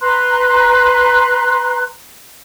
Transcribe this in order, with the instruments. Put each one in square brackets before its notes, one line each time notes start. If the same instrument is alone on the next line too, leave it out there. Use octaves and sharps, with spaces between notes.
[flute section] B4 A#5 C6 F#6